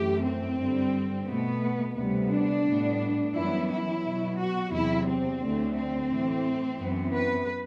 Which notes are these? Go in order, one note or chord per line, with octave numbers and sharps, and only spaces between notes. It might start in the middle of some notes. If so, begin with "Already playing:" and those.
Already playing: F#2 E3 A3 G4
C4
G2 D3 G3
B2 A3 B3
D2 C3 G3 B3
D4
A2 G3 B3
F#2 E3 G3 B3 E4
E4
B2 F#3 B3
F#4
E2 C3 F#3 E4
C4
D2 D3 F#3 A3
C4
A2 E3 A3
F#2 E3 B3
B4